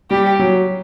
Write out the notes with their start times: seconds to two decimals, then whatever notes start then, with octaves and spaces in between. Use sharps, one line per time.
0.11 G3 G4
0.39 F#3